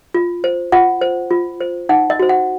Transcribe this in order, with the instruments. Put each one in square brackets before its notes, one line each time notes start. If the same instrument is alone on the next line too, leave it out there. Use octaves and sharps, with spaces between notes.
[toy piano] F4
C5
F4 F#5
C5
F4
C5
D#4 F#5
D#5
F#4 C5
F#5